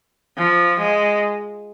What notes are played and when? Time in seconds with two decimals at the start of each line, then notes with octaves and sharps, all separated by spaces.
0.38 F3
0.80 G#3